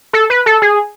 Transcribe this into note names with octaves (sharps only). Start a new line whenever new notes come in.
A4
B4
A4
G#4